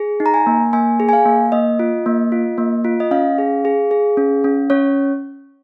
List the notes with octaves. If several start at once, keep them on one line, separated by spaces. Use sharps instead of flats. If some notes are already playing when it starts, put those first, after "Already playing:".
Already playing: G#4
D#4
A#5
G#5
A#3
A#3 G#5
G#4
G#5
F5
A#3
A#3 D#5
F4
A#3
F4
A#3
F4
D#5
C#4 F5
G#4
G#4
G#4
C#4
C#4
C#4 C#5